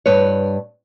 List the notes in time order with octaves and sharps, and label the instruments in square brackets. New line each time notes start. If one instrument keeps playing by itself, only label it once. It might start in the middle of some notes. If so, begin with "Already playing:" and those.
[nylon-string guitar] G2 B4 C#5